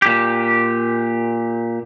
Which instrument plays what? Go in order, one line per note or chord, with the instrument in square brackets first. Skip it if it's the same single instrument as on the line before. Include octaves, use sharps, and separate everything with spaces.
[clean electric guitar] A#2 G4